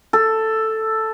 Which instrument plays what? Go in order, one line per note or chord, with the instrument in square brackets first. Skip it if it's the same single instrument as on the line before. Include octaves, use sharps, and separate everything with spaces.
[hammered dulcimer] A4